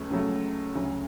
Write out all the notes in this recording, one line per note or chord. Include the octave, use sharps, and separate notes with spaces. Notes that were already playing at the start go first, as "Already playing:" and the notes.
Already playing: C#2 C#3 F#3 A3
C#2 C#3 F#3 A3
D2 C#3 F#3